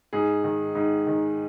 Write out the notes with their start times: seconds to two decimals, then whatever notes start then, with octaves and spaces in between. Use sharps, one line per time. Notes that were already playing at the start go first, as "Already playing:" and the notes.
0.13 G#2 G#4
0.44 D#3
0.75 G#2
1.07 D#3